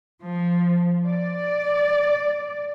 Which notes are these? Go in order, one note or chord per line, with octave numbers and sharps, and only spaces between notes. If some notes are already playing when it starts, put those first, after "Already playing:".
F3
D5